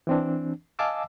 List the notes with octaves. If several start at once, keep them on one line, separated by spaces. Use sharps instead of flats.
E3 C4 D4
D#5 F5 G#5 A5 D6 E6